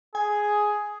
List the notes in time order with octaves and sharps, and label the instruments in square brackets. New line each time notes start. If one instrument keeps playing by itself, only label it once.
[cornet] G#4 [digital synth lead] G#5